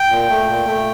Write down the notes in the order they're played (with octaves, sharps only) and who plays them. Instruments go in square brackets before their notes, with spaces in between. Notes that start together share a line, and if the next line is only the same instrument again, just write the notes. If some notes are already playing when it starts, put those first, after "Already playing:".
Already playing: [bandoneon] G5
A#2
A3
A#2
A3